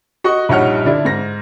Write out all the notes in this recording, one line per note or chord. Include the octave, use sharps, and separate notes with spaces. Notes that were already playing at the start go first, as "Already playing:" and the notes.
F#4 D#5 F#5 C#6
A#1 G2 D#4 C#5 F#5 F6
D3 D4 E4
G#2 A#6